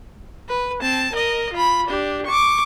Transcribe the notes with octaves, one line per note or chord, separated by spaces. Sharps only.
B4
C4 A5
A#4 D#5
F4 B5
D4 G4
C#6 D6